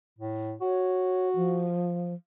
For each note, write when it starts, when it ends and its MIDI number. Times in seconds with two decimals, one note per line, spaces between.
0.19 0.53 45
0.61 1.66 66
0.61 1.29 73
1.35 2.14 53